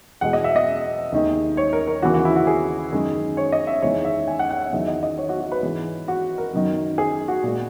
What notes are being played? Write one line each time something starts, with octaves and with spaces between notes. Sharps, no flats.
E2 B2 G#3 F#5
D#5
E5
D#5
D#2 D#3 G#3
C#5
A#4
A#4
D#2 C#3 E3 F#4
F#4
E4
F#4
G#4
F#2 D#3 G#3
C#5
D#5
E5
E2 D#3 G#3 C#5
E5
G#5
F#5
F#5
F#5
E2 D#3 F#3 E5
D#5
D#5
C#5
F#4
F#4
B4
G#2 E3 G#3
F#4
A#4
F#2 D#3 F#3
G#4
F#4
A#2 G#3